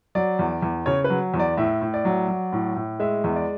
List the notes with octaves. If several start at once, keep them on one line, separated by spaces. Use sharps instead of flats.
F#3 D5
E2
E2
C#3 C#5
B4
F#3
E2
D5
A2 E5
A2
D5
F#3
F#3
A2
A2
G#3 E5
E2 E5
D5